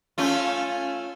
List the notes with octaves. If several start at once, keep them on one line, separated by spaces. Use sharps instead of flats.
A3 C#4 F4